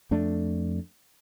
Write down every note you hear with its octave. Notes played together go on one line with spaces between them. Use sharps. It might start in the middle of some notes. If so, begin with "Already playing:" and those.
F2 A3 D4